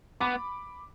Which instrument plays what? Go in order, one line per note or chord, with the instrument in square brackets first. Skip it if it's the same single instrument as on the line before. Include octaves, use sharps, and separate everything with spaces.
[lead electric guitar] B3 [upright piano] B5 D6